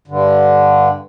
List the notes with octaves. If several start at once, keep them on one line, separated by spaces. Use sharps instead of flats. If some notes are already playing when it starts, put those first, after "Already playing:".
G2 D3